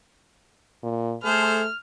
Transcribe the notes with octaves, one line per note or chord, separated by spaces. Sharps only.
A#2
A3 G#4 A4 C5 F6